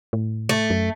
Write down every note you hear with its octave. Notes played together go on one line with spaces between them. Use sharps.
A2
A3
F#2